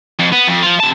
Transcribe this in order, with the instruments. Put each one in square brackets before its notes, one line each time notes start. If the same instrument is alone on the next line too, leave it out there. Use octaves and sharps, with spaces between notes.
[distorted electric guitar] F2
B3
F2
F3 F4
C3 A5